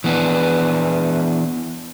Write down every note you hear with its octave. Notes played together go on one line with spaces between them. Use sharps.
E3 B3 D4